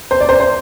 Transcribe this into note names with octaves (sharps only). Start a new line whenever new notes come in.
C5
D5
C5
C5